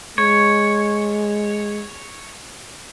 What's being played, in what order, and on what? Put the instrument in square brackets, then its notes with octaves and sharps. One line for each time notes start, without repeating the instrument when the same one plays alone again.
[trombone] G#3 [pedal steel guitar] C#5